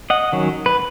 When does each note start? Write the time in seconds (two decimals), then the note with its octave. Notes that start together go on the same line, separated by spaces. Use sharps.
0.10 D#5 F#5
0.33 D#3 F#3 C#4
0.66 B4